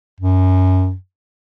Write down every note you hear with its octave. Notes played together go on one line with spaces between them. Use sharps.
F#2